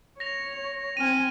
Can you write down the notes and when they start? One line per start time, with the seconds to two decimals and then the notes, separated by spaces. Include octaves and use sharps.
0.20 C#5 A#6 F7
0.97 C4 G#5 F6 D#7